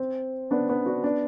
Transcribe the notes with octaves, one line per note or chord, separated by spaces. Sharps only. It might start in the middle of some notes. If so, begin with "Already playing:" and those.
Already playing: C4
B3 D4
B3 D4
D4 F#4
B3 D4